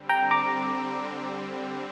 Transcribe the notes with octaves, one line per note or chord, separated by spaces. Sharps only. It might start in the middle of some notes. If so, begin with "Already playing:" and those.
Already playing: D3 G3 C4
G5 A#5
A#5 D6